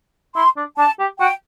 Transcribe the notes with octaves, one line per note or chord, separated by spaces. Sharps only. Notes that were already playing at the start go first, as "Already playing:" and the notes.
E4 C6
D4
D4 A5
G4
F#4 G5